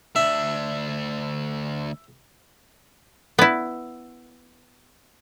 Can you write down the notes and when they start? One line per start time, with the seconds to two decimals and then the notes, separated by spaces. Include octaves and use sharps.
0.16 D2 D4 E5
3.39 B3 E4